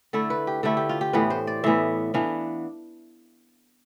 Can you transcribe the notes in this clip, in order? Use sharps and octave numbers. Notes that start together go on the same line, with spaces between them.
D3 A3 E4 A4
B4
G4
D3 A3 E4 G4
G4
F4
G4
A2 E3 B3 B4
C5
D5
A2 E3 B3 E5
E3 B3 D4 F5